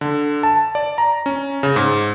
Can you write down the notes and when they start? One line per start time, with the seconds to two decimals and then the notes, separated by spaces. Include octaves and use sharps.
0.01 D3
0.43 A5
0.75 D5
0.98 A#5
1.26 C#4
1.63 C#3
1.76 G#2